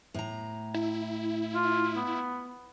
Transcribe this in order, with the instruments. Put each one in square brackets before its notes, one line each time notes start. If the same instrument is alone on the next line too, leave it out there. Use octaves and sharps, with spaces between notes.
[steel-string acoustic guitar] A2 A#5
[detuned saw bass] E4
[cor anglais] F4
B3